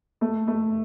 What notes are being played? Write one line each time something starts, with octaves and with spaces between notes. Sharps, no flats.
A3
A3